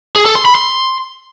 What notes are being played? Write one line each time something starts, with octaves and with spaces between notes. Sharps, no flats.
G#4
A4
C6
B5
C6